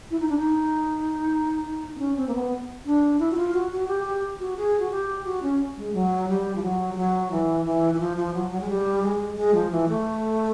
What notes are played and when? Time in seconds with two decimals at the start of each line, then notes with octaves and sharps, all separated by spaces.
0.11 E4
0.20 D#4
0.29 D4
0.38 D#4
1.96 C4
1.99 C#4
2.16 C4
2.28 A#3
2.34 B3
2.86 D4
3.20 E4
3.32 F#4
3.36 F4
3.54 F#4
3.71 F#4
3.88 G4
4.05 G4
4.40 F#4
4.57 G#4
4.80 F#4
4.91 G4
5.25 F#4
5.43 C#4
5.77 G#3
5.94 F#3
6.29 G3
6.55 F3
6.63 F#3
6.93 G3
6.96 F#3
7.31 E3
7.65 E3
7.93 E3
7.99 F3
8.17 F3
8.34 F#3
8.51 F#3
8.61 G#3
8.69 G3
9.03 G#3
9.37 G#3
9.54 F3
9.71 E3
9.88 A3